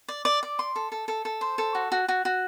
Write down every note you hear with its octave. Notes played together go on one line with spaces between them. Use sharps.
D5
D5
D5
C6
A4
A4
A4
A4
C5
A4
F#4
F#4
F#4
F#4